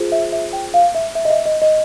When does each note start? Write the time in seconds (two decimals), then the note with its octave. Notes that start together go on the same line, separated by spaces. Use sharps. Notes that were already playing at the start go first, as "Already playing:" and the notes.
Already playing: F4 G#4 C5
0.12 E5
0.32 E5
0.53 G5
0.74 F5
0.95 E5
1.15 E5
1.25 D#5
1.30 E5
1.46 D#5
1.62 D#5